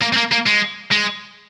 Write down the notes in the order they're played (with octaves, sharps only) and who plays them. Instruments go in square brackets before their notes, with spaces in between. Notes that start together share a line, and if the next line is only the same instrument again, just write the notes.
[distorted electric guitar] A#3
C4
A#3
A#3
G#3
G#3